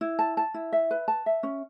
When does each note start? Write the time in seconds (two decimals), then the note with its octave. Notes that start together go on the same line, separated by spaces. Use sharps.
0.01 E4
0.19 A5
0.37 A5
0.54 E4
0.73 E5
0.91 B4
1.08 A5
1.26 E5
1.43 C#4